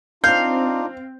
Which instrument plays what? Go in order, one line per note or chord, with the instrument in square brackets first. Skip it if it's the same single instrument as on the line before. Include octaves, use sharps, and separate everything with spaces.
[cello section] C4 [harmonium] D4 D#4 F4 [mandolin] F5 [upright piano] G6